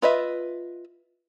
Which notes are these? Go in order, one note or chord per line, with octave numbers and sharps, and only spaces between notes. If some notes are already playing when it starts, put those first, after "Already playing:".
F4 B4 D#5 E5